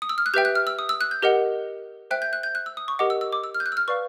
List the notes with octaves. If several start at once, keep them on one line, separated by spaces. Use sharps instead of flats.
D#6
E6
F6
F#6
G4 B4 E5 G5 G6
F#6
F6
E6
D#6
E6
F#6
G6
G4 A#4 D#5 F#5
C5 E5 G5 F#6
G6
F#6
G6
F#6
E6
D#6
C#6
G4 A#4 D#5 F#5 D6
E6
E6
D6
E6
F6
G6
F#6
E6
F6
B4 D5 F5 C#6